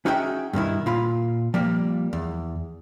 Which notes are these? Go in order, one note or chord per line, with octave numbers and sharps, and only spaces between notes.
C#4 D#4 F#4 G#4 E5 G5
G2 B2 D#3 E4
A#2 F4 B5
F3 G3 A#3
E2